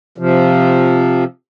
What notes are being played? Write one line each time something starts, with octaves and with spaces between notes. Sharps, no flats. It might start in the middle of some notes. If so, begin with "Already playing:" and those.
C3 F3